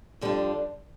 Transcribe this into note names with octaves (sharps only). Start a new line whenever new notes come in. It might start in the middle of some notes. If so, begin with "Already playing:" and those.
F2 D3 G3 D4 F4